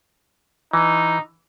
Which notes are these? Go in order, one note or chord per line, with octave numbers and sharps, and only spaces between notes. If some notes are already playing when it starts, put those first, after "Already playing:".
E3 D#4